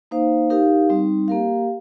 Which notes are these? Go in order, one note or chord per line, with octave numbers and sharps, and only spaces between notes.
A#3 D#4 C5 F5
D#4 G4 A#4 F5
G3 C4 D#4
A#3 G4 A#4 F5